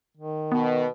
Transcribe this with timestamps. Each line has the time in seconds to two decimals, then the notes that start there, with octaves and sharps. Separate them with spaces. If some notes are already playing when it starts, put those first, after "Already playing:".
0.17 D#3
0.52 B2 B3